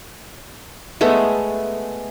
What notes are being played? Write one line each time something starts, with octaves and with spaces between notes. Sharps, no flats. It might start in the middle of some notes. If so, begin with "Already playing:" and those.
G#3 A3 B3